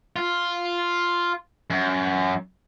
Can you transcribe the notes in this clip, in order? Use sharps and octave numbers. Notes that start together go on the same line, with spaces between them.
F4
F#2